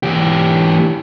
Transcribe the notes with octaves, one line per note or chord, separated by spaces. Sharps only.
E3 G4